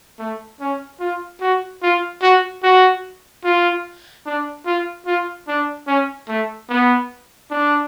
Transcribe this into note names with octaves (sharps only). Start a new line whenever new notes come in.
A3
C#4
F4
F#4
F4
F#4
F#4
F4
D4
F4
F4
D4
C#4
A3
B3
D4